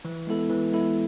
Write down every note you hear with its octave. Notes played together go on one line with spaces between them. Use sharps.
E3
G#3 B3 E4 A4
E3
G#3 B3 E4 A4